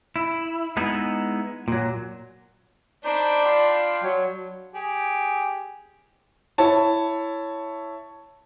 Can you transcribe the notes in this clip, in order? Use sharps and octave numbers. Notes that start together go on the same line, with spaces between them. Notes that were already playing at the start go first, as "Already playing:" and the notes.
E4
G#3 B3 D#4 E4
A#2 F#3
D4 D#4 C5 D5 B5
F4 F5 G5
F#3 C#5
G4 G#4
E4 C#5 A5